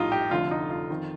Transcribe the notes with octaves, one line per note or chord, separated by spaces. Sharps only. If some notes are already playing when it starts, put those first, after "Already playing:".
Already playing: A#1 A2 G3 D#4 F4
G4
F1 F2 D3 A3 F4
D#4
F4
F2 D#3